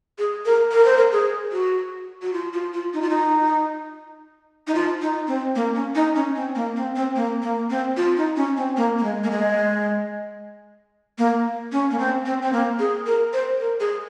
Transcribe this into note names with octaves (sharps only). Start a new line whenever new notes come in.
G#4
A#4
A#4
C5
A#4
G#4
F#4
F#4
F4
F4
F4
D#4
F4
D#4
D#4
F4
D#4
C4
A#3
C#4
D#4
C#4
C4
A#3
C4
C4
A#3
A#3
C4
F4
D#4
C#4
C4
A#3
A#3
G#3
A#3
G#3
A#3
C#4
A#3
C4
C4
C4
A#3
G#4
A#4
C5
A#4
G#4